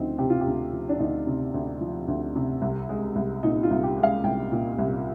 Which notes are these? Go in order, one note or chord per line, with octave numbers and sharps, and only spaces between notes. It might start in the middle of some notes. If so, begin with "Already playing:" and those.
Already playing: D2 F3 C4 D#4
C3 G4
F4
G4
D2
F3
D4
D2 D#4
C3
D2
F3
D2
C3
C2
G#3
C2
A#2 D#4
F4
C2
G4
G#3
F5
C2 G5
A#2
C2